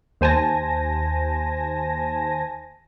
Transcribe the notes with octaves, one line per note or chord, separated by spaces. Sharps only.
D#2 C5 G#5 A5 A#6